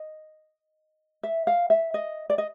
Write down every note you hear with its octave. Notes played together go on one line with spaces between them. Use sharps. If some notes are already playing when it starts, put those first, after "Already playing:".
Already playing: D#5
E5
F5
E5
D#5
D5
D#5